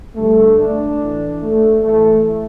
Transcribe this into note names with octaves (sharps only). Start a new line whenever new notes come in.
G2 D3 A3
A3 D4
A2 E3
A3
A2 E3 A3